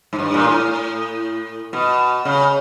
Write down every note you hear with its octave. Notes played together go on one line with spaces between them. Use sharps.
G#2
G2
A#2
A2
B2
C#3